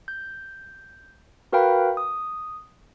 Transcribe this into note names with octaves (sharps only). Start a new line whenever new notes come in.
G6
F#4 A#4 B4 F5 G5 B5
D#6